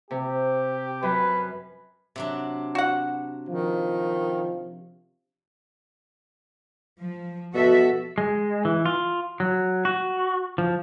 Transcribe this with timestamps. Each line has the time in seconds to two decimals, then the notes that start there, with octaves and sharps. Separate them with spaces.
0.11 C3 G4
1.03 F#2 B4
2.16 C3 F#3 D4
2.75 F#4 F#5
3.49 D#3 F3
7.00 F3
7.54 B2 F#4 A4 E5
8.18 G#3
8.65 E3
8.86 F4
9.40 F#3
9.85 F#4
10.58 F3